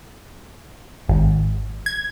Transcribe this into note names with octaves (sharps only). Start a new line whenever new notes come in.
G#1
G#6